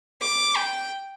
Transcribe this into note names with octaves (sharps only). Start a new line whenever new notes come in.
D6
G5